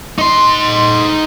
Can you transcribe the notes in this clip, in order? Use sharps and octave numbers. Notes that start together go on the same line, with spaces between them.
D#4 C6